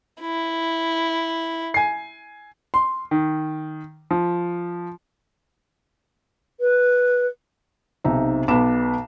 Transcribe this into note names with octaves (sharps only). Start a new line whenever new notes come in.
E4
G#5 C7
C6
D#3
F3
B4
B1 C3 D#4 E5
B1 B3 B5 D6 E7